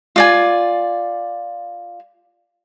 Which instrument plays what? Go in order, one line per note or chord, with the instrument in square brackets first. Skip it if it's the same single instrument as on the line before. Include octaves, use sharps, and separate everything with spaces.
[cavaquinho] F4 D5 G#5